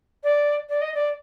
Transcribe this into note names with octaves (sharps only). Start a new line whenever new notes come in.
D5
D5
D#5
D5